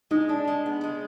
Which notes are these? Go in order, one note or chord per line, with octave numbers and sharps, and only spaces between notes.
G#3 D#4
D4
G#3
B3
G#3